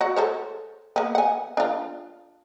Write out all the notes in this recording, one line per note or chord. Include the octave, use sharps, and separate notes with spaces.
F#4 F#5
A4 C5 C#5
A#3 B3
F#5 G#5
D4 F4